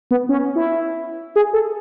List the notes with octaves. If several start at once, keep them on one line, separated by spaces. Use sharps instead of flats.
B3
C#4
E4
G#4
A4